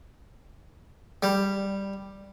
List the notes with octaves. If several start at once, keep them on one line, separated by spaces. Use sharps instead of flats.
G3